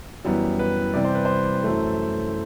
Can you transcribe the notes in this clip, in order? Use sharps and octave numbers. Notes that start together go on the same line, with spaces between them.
F#2 E3 G3 B3
B4
C3 E3 G3 D5
C5
B4
C5
F#2 E3 A3